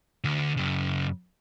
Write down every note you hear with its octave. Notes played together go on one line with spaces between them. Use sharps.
D2 D3
F#2 C#3